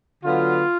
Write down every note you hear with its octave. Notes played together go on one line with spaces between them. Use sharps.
D3 F#3 B3 F4